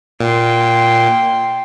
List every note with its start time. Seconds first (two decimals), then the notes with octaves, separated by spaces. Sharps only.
0.20 A#2 G5 C6